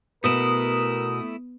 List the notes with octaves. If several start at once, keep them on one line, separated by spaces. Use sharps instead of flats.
B2 A3 E4 A#4 D#6